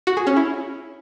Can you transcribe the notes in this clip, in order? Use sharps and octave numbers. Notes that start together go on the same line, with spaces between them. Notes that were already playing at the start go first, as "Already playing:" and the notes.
F#4
G#4
C#4
E4